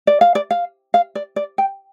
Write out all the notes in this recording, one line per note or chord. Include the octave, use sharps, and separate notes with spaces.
D5
F5
D5
F5
F5
D5
D5
G5